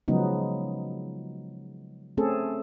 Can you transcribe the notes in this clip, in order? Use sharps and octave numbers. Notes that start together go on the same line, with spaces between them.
C#3 F3 F#3 G#3 B3 D#4
A3 C4 C#4 G#4 A4